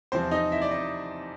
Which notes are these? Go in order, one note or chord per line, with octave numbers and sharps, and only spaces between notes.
E2 C3 F3 C4 C5
D#4 D#5
E4 E5
D5
D#4 D#5